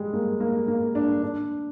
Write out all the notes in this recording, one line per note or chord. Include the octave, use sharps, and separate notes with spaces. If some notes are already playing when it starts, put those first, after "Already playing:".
Already playing: G3 G#3
A#3
A#3
A#3
D4
D4